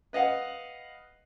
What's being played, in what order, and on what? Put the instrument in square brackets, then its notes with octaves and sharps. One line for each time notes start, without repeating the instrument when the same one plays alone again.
[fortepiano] B4 D#5 F5 F#5